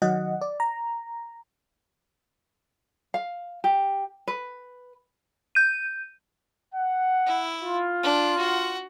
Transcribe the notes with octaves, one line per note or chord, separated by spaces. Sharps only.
D#3 F#3 D#5 F#5
D5
A#5
F5
G4
B4
G6 D#7
F#5
E4
F4
D4 F#6
F#4 F#5